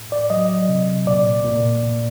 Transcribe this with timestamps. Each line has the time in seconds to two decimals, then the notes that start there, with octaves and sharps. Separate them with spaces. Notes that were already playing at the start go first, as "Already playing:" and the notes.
Already playing: A2
0.12 D5
0.30 F#3 D#5
0.69 C3
1.06 A#2 D5
1.45 A#2
1.83 A#2